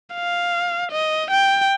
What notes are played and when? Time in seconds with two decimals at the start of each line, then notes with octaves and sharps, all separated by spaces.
0.14 F5
0.92 D#5
1.31 G5